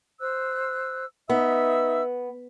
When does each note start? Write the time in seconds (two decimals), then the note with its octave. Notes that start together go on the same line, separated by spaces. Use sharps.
0.20 C5 E6 F#6
1.30 B3 D#4 E5 E6